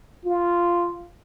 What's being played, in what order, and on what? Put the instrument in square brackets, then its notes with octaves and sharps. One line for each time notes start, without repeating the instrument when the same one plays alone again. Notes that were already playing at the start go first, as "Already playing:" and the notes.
[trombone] F4